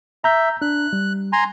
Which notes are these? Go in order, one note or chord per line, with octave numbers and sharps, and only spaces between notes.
E5 A#5 G6
D4 F#6
G3
G#5 A#5 C6